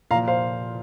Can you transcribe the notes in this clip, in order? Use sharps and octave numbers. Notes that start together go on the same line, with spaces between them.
A#2 F3 F5 A#5
C5 F5